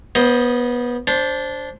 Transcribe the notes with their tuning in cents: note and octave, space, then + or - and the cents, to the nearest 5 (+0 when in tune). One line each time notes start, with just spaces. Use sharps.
B3 -20 C5 +15 D#5 +0
D4 -15 C5 +10